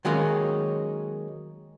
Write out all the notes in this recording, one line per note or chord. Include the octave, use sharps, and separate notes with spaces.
D#3 F#3 G#3 A#3 C#4